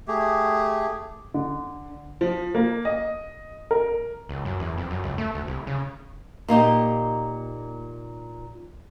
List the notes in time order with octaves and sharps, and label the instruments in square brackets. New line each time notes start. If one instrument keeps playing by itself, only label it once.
[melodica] A3 G4 G#4
[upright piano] D3
F3
A#3
D#5
A#4
[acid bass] C#2
F#2
E2
F2
F#2
C#2
A3
D2
C2
C#3
[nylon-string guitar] A#2 A#3 D#4 G4